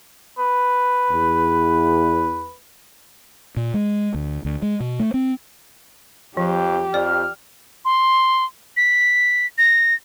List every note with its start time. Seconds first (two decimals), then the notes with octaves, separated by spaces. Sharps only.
0.38 B4
1.11 E2
3.57 A#2
3.74 G#3
4.14 D2
4.45 D2
4.62 G#3
4.80 B2
4.99 A3
5.14 C4
6.37 F2 F3 G4
6.94 F2 D5 F6
7.85 C6
8.77 B6
9.58 A#6